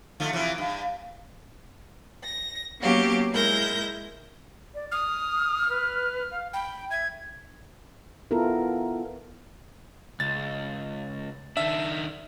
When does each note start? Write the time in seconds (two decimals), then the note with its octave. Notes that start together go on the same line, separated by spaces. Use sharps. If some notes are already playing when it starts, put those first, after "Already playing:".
0.20 D3 F3 A3
0.33 C3 E3 F3
0.58 G2
2.23 A#6
2.81 F#3 A#3 B3 C#4 G4 F5
3.32 G#3 E4 A#4 G6 A#6
4.74 D5
4.91 D#6 F6
5.69 B4
6.31 F5
6.53 G5 B5
6.91 E5 G#6
8.31 B3 E4 F4 A4 A#4
10.20 C#2 A6
11.57 D#3 D4 E5